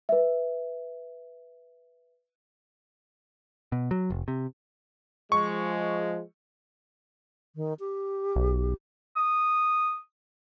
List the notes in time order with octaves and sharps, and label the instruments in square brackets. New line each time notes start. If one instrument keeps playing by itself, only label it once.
[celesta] B4 E5
[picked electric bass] B2
F#3
F1
C3
[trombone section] F3 G#3 [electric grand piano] C#6
[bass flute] D#3
G4
[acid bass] B1
[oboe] D#6